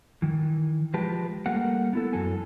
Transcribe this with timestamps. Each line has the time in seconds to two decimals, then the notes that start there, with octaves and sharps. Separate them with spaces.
0.22 D#3 E3
0.94 F3 G#3 G4 B4 A5
1.46 G3 A3 A#3 A#4 F#5
1.93 B3 E4 A4
2.13 F#2 E3 F#3 A4 G#5